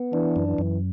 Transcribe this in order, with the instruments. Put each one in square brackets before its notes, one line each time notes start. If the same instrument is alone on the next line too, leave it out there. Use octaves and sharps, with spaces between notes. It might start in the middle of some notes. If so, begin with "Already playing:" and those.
Already playing: [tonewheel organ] B3
[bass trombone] E3 [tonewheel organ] D4
[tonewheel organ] F#2
[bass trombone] E3
[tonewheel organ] F#2